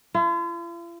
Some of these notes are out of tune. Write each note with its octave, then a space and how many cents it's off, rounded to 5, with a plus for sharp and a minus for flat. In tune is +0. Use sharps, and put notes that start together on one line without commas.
F4 -45